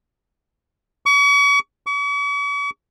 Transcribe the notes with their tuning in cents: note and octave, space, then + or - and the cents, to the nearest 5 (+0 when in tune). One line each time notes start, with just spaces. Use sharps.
C#6 +40
C#6 +45